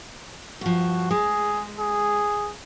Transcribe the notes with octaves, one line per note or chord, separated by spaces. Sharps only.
G2 F3 F#4
G#3 G#4
G#4